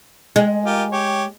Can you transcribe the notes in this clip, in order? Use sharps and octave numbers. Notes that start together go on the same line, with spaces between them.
G#3
F4 G4 A#4
G4 C#5